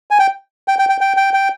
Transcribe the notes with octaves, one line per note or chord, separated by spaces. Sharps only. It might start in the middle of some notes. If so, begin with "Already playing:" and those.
G#5
G5
G5
G5
G5
G5
G5
G5